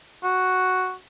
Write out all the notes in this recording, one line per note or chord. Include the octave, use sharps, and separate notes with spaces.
F#4